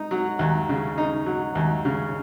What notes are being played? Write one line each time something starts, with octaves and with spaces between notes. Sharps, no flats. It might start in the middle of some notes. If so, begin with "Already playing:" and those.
Already playing: D#4
F#3
D#2
C#3
D#4
F#3
D#2
C#3